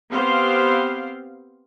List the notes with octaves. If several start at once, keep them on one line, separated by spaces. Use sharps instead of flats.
B3 C4 G4 C5 F5